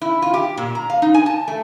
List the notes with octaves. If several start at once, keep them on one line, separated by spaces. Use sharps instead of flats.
E4
F4
G4
A#2
A#5
F5
D#4
G#5
A5
A3